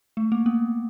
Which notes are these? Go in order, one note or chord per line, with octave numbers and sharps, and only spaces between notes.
A3
A#3
B3